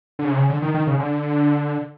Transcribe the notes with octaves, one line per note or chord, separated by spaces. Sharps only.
D3
C#3
C3
C#3
D3
D#3
D#3
C#3
D3